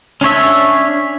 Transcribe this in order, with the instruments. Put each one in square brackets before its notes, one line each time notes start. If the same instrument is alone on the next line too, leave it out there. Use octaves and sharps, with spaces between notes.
[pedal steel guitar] C#4 D4 C#5 E5